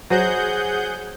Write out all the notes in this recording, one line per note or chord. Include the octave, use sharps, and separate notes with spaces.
F#3 G#4 C5 D#5 F#5 G6